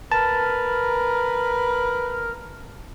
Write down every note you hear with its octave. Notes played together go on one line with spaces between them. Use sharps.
A#4 B4 A5